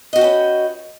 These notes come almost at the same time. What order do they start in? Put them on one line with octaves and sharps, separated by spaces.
D#5 F#4 G5 C#4 B4